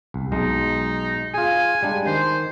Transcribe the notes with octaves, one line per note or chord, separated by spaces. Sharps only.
C2
B1 G#3 D#4
F4 G#4 G#5
G3 G#3 D4
D#3 C5